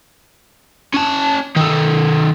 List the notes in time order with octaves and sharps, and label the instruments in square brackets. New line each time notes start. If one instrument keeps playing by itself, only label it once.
[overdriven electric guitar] C#4 A5
D#3 A4